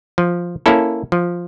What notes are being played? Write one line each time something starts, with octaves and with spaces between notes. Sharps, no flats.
F3
A#3 C#4 E4 A4
F3